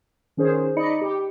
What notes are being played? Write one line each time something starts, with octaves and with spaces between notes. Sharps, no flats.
D#3 C#4 G#4 C5
D#4 D5 D#5 B5 C#7
G4